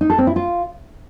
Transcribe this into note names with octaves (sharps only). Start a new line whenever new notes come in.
D#4
A4
C4
E4
F4